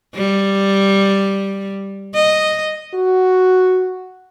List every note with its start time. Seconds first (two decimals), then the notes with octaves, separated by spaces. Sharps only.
0.15 G3
2.15 D#5
2.94 F#4